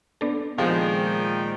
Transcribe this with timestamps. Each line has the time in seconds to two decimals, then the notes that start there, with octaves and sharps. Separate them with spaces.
0.21 B3 D4 A4
0.58 A#2 D#3 F3 G#3 G5